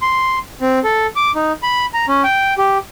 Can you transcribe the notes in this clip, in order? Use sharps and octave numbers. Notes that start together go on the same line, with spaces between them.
C6
C4
A4
D6
D#4
B5
A#5
C#4
G5
G4